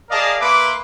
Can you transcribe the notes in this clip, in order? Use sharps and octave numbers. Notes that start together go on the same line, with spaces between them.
G#4 A#4 D5 D#5 F5 A5
A#3 B4 E5 C6 D6